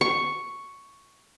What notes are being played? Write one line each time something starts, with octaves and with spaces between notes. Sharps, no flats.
C#6